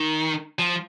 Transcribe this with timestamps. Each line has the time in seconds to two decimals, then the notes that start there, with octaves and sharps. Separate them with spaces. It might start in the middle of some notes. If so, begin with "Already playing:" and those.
Already playing: D#3
0.59 F3